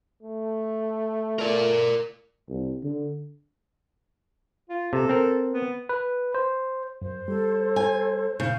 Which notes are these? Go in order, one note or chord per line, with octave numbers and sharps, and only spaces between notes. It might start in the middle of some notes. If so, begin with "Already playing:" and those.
A3
A#4 D5
C2
D3
F4
C3 A4
C4 A#4
B3
B4
C5
F#2 C5
G3 A4
G#5
A#2 C#3 G6